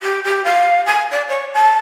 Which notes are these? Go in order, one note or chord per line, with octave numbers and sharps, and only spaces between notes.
G4
G4
F5
G#5
D5
C#5
A5